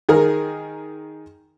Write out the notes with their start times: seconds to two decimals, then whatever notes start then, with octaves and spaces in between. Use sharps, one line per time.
0.09 D#3 G#4 A#4